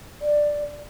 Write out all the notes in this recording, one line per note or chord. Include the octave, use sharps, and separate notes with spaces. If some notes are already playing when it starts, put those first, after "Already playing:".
D5